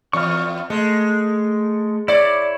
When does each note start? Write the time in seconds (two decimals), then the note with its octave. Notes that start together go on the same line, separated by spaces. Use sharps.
0.13 E2 C#6 F6
0.70 G#3 A3
2.08 E4 C#5 D5